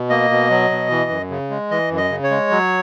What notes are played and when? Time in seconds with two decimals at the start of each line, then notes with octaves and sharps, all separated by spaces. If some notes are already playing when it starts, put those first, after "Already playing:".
Already playing: B2
0.10 A#3 D#5
0.30 B2
0.50 F#3
0.70 B2
0.90 E3
1.10 F#2
1.30 C#3
1.50 G#3
1.71 E3 D#5
1.91 F#2
1.97 D#5
2.11 C#3
2.23 C#5
2.30 G#3
2.51 F#3